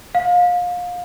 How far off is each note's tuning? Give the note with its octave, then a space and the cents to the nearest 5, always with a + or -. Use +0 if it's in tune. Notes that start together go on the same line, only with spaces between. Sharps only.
F5 +30